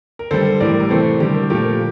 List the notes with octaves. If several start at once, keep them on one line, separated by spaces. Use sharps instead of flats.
A#4
D3 G3 A4 C5
A2 E3 G3 A#4 D5
A#4
C3 E3 A3 A4 C5
D3 G3 G4 A#4
A#2 F3 A3 G4 A#4